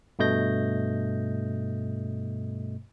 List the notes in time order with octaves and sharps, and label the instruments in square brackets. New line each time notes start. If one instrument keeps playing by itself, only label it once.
[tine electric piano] G2 B2 A3 D#5 G6 A#6